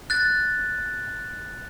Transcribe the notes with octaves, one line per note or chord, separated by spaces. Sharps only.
F#6 A6